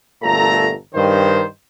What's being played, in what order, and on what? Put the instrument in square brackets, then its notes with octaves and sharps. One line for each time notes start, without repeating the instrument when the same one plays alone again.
[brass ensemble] G1 A#2 A3 A4 A#5
G2 D#3 C5